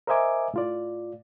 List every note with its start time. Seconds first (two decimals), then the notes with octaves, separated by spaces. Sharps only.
0.07 A#4 C5 D#5 E5 G#5 D6
0.54 A2 F4 D5